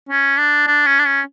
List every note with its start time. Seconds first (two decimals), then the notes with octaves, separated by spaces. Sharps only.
0.09 C#4
0.38 D4
0.67 D4
0.87 C#4
0.99 D4
1.06 C#4